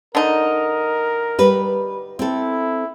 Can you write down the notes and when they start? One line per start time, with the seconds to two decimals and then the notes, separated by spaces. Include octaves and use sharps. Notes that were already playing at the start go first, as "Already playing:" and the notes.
0.15 D3 D#4 A#4
1.39 G3 B4
2.19 C4 E4 A4